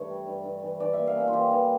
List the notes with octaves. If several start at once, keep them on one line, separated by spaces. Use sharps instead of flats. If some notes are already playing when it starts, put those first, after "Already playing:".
Already playing: G2 E3 A3 A#4 C#5
G3
G2
G2
E3
E3 D5
E5
A#3
F5
C#4 E5
F4
E3 G4
E3